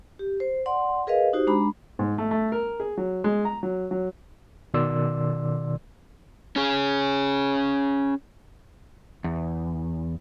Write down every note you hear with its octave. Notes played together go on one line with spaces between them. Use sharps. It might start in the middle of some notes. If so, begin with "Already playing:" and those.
G4
C5
D5 F#5 C6
G#4 A#4 B4 D#5 F5
D#4 F#4 G4 C5
G#3 D4 A#5 B5
G#2
A3
A3
A#4
G#4
F#3
G#3
A#5
F#3
F#3
B2 D#3 D5 C6 E6
C#4 G#4
E2